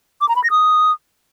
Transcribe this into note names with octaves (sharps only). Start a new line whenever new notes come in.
D6
A#5
B5
A#6
D#6